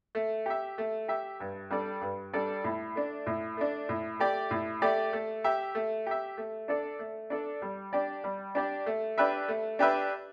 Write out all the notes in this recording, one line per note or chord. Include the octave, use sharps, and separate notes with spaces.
A3
G4 E5
A3
G4 E5
G2
G3 D4 A4 D5
G2
G3 D4 A4 D5
A2
A3 D4
A2
A3 D4
A2
A3 G4 D5
A2
A3 G4 D5
A3
G4 E5
A3
G4 E5
A3
D4 A4 D5
A3
D4 A4 D5
G3
D4 G4 D5
G3
D4 G4 D5
A3
D4 G4 B4 E5
A3
D4 G4 B4 E5